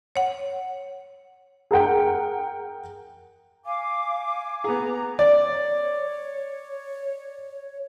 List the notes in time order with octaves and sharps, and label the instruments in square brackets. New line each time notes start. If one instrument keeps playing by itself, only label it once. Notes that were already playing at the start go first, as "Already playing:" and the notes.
[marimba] C#5 F#5
[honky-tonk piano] G#4 A#4 F#5 G5
[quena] F5 [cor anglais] G#5 [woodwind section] D6
[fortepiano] B3 G#4 [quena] A#5
[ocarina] C#5 [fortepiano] D5